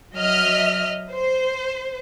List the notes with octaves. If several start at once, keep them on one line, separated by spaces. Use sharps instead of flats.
F#3 D#5 E5 F6
C5